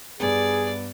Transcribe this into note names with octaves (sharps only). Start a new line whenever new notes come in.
G2 B3 G#4 D5